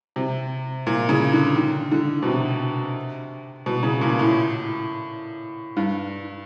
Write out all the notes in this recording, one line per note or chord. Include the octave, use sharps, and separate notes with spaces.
C3
A#2
C#3
D3
D#3
D3
B2
C3
B2
C#3
A#2
A2
G2